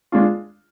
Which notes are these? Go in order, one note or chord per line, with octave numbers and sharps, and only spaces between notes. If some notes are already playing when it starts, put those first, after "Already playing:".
G#3 D4 F4